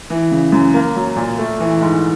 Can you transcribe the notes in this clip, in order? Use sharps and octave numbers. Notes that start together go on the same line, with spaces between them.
E3
C#3
F#2
A#3
F#3
A#2
A3
E3
G#2